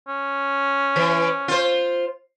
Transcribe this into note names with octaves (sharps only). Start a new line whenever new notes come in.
C#4
E3
F4 C5